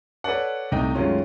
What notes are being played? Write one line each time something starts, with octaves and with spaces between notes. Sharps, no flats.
A4 B4 C#5 D5 F#5
C2 A3 D#4 D#5 G5
F#2 D#3 G#3 A3 C#4 F4